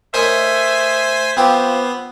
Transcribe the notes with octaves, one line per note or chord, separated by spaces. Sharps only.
A3 D#4 A#4 C5 C#5 E5 G#5 B6
F3 B3 C4 F4 G4 C5